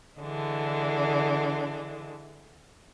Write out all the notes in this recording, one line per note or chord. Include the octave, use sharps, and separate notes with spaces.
D3 E3 G#3 D4